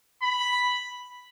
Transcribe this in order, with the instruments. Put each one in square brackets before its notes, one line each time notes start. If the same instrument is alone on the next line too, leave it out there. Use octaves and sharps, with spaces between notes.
[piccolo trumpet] B5